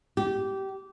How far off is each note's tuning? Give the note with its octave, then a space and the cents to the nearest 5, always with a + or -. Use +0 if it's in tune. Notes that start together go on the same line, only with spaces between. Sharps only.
G4 -20